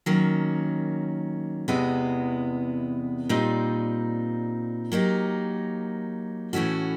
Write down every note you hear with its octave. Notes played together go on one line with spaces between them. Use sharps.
D#3 F#3 A#3 C#4
E2 C3 E3 G#3 B3
A#2 G3 C4 D#4
F#3 A#3 D#4 G4
A2 E3 A3 C#4 F#4